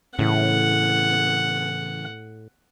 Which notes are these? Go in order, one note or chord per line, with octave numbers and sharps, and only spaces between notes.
A2 C#3 E3 F#5